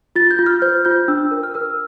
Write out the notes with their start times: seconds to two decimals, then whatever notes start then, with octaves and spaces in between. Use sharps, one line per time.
0.16 F4 A6
0.31 G6
0.39 F4
0.46 F6
0.62 C5 G6
0.85 F4 G6
1.08 D4 E6
1.31 A#4
1.43 F6
1.54 A#4 E6